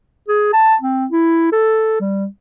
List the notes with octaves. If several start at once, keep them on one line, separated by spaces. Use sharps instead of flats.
G#4
A5
C4
E4
A4
G3